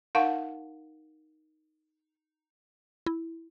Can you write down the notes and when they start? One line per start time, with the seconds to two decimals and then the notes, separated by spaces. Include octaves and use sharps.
0.15 D#4 A#4 F5 F#5 A5 C#6
3.06 E4